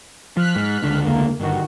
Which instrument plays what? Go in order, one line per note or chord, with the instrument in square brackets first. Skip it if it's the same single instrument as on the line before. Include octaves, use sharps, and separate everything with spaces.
[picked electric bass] F3 [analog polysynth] F6 F#6 B6
[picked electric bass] G#2
C#2 D3
[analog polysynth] E2 A#3
[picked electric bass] G1 [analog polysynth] D#3 F#4